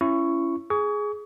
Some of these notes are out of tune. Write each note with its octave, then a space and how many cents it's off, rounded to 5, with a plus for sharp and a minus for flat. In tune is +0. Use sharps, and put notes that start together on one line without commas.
C#4 +0 E4 +30 C#6 +0
G#4 +5 C#6 +35